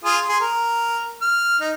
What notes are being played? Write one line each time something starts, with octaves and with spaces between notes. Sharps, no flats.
F4 G#4 D#6
G#4 C6
A#4
F6
D#4